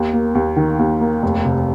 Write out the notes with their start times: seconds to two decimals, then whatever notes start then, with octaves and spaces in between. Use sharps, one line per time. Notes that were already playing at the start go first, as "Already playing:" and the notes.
Already playing: D#2
0.13 A#3
0.35 D#2
0.57 D#3
0.79 D#2
1.01 A#3
1.23 F1
1.45 C3